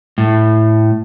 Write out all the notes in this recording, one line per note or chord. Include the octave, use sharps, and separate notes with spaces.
A2